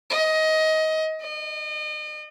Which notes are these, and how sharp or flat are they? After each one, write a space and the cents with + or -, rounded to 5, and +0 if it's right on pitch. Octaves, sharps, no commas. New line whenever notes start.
D#5 +20
D#5 -35